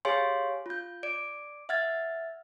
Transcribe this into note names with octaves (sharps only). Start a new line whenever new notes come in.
G4 G#4 C#5 F5 G#5 C6
F4 G6
D5 D7
E5 F#5 F6 G#6 A6